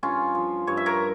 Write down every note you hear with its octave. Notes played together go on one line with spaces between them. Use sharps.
G2 C#4 F4
F3
G2 C#5
E5
A#4 C#5